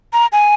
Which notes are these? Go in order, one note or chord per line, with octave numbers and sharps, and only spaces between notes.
A#5
G#5